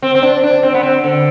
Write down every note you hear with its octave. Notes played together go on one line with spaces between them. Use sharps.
C4
C4
D4
D4
C4
B3
C4
D3